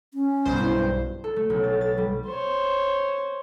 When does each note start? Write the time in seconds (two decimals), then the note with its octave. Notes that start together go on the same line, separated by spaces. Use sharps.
0.14 C#4
0.45 B1 G2 C5
0.59 E4
1.24 A4
1.36 A3
1.50 B1
1.63 A6
1.81 A6
1.98 G3
2.27 C5 C#5